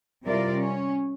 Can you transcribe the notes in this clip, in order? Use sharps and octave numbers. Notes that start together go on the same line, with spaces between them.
C3 G3 E4 F4 A#4 D5
C#4